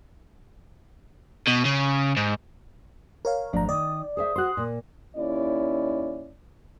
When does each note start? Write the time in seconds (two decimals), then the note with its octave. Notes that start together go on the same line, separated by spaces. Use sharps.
1.47 B2
1.65 C#3
2.17 G#2
3.25 A#4 C#5 F5
3.53 G#1 F3 A3 D4 D5 A#5
3.69 D#3 D5 D#6
4.17 G#4 C5 E5 D#6
4.36 F#4 C5 C6 F#6
4.57 A#2
5.16 D#2 C#4 E4 D5